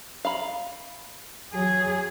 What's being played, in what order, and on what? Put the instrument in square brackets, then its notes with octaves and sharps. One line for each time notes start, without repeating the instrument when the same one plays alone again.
[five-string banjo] F5 A#5 B5
[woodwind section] F#3 [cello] G#4